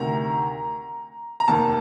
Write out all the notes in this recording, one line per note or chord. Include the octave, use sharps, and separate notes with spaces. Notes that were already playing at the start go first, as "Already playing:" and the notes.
Already playing: D2 C3 D#3 A#5
A#5
F1 D#2 D#3 A5